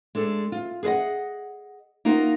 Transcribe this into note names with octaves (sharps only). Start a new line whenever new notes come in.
G#3 D4 A4
F4
G#4 B4 C5 D#5 F#5
A#3 D#4 F4 F#4 A#4